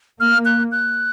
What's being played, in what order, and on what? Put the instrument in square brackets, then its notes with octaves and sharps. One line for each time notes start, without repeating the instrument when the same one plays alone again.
[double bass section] A#3 [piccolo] F6
[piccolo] F#6
F#6